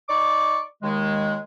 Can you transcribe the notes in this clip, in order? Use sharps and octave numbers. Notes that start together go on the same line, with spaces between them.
D#4 D5 C#6 D6
D#2 D#3 G#3